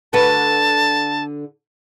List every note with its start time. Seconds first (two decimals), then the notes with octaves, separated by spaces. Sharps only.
0.13 D3 F#4 B4 A5